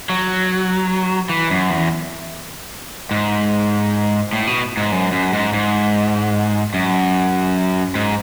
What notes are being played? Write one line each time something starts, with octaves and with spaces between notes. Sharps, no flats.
F#3
E3
F#2
E2
G#2
A2
B2
G#2
F#2
F#2
G#2
G#2
F#2
G#2